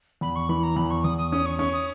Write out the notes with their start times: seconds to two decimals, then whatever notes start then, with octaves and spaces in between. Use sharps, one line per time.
0.21 E2 B5
0.36 C#6
0.49 E3 B5
0.63 A#5
0.76 E2 B5
0.91 C#6
1.04 E2 D#6
1.18 D#6
1.32 C#4 D#6
1.46 C#6
1.59 C#4 C#6
1.73 D#6